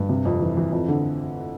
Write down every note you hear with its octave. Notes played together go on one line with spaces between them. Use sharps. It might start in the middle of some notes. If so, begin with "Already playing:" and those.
Already playing: G2
C3
F2
E3
E3
F2
D3